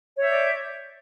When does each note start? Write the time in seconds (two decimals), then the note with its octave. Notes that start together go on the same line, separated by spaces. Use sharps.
0.17 C#5
0.21 E5
0.24 G6
0.28 D5